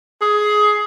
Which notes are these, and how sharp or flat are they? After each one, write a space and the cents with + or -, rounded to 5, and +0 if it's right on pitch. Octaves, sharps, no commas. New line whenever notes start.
G#4 +15